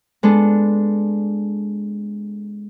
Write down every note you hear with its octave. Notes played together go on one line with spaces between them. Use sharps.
G#3 B3 D4 A4